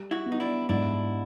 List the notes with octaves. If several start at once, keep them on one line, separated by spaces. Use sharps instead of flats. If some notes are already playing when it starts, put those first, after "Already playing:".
Already playing: G3
E4 F#4
B3
D#4
D4 E4
G#2 D4 E4